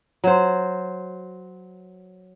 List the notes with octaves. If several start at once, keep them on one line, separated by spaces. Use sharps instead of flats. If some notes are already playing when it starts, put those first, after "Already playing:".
F#3 C5